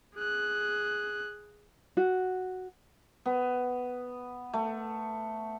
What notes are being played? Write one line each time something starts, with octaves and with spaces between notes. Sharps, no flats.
G#4 F#6
F#4
B3
A3